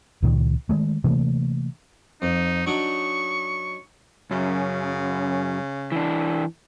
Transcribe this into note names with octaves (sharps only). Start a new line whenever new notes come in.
C#2 A#2 D#3
D#3 G#3 A3
C3 E3 A3 A#3
F2 D#4
F#3 D4 D#4 C#6
F#2 C#3
E3 D4